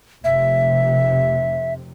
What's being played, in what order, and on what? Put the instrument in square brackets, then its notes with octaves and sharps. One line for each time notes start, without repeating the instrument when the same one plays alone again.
[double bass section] F1 C3 [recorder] E5